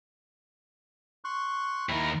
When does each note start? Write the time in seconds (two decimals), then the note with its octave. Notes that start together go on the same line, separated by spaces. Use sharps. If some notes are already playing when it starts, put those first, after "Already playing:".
1.24 C6 C#6 F#6
1.89 D#2 E4 A#4